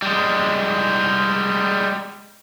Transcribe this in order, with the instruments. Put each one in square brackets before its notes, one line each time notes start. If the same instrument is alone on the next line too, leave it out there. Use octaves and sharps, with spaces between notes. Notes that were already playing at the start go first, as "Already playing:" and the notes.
[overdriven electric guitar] G3 G#3